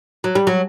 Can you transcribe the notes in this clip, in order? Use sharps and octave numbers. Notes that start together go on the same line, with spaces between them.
F#3
G3
F#3